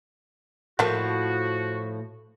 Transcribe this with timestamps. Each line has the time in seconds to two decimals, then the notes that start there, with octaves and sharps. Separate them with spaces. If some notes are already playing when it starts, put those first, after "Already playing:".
0.79 A2 F3 A3 A#3 F#4